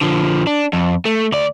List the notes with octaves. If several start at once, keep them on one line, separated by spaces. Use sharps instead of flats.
D3 F3
D4
F2
A3
D2 D5